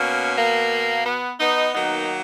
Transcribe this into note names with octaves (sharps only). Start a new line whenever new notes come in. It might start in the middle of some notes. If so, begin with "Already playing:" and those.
Already playing: B2 A#3 C#4
A#3
B3
B3 D#4
D#3 F#3 A#3 B3 D#4